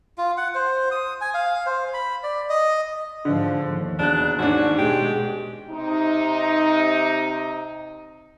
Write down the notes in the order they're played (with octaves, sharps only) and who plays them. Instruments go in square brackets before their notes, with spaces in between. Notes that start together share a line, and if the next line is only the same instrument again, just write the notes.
[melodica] F4
F#5
C5
D#6
G#5
F5
C5
B5
D5
D#5
[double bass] G#2 F3 [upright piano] D3
[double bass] D#2
[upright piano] E1 F#6 [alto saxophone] D4
[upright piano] G#2 C#4 D4 [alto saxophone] F#4
[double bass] B2 G#3 [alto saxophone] G4
[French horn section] C3 D#4